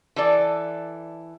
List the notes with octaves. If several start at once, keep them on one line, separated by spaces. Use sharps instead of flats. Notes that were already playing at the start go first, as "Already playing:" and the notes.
E3 A4 D5